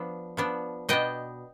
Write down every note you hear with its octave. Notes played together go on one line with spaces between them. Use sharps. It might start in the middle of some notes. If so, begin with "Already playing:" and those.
Already playing: F3 B3 D4
F3 B3 D4
B2 B3 D4 D#5 G5